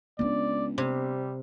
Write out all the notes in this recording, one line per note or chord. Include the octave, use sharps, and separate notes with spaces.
C#2 B3 D4 D5
C3 G3